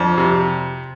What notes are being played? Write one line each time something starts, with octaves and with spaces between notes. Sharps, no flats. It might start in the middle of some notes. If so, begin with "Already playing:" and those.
Already playing: F2 D4
C3